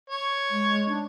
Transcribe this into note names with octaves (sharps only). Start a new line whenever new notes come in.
C#5
G#3
D4